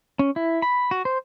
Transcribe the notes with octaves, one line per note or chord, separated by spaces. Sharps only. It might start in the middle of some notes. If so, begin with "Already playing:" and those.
C#4
E4
B5
F#4
C5